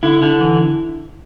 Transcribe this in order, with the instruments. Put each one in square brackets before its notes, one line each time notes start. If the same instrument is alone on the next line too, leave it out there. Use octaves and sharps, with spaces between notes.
[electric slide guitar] D3 E4
D3
E3